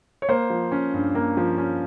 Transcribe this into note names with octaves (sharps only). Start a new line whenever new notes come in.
C#5
A#3 C5
F3
C#4
G2
A#3
F3
C#4